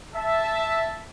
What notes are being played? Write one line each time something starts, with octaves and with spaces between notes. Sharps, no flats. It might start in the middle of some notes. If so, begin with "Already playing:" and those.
E5 A5